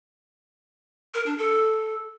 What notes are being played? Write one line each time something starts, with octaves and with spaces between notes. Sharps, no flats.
A#4
D4
A4